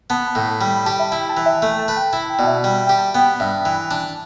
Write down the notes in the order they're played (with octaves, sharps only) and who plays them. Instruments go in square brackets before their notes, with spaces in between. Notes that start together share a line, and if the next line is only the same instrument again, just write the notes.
[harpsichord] B3 [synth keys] A5
[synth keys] B5
[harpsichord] A2
[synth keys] A5
[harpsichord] G3 [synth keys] A5
[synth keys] B5
[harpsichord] G4 [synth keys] A5
[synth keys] E5
[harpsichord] E4 [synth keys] G5
[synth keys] A5
[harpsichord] E3
[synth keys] E5
[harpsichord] A3 [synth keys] E5
[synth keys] A5
[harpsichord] B4
[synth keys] G5
[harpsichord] E4 [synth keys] A5
[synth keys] G5
[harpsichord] B2 [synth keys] D5
[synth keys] E5
[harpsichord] G3 [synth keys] E5
[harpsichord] G4 [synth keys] G5
[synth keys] A5
[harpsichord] B3 [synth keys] G5
[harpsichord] G2 [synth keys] E5
[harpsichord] E3
D4